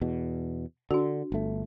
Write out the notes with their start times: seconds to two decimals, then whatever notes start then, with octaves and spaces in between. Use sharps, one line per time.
0.01 E2 B2
0.91 D3 D4 F#4
1.32 G1 A3